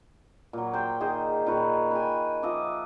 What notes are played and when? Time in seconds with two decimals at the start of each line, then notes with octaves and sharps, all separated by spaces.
0.53 A#2 F#3
0.73 C5 G5
1.00 D#3 G#4 C5
1.46 A#2 D#3 B4 C#5
1.91 B4 G5 G#5
2.43 F3 D#5 E5 D6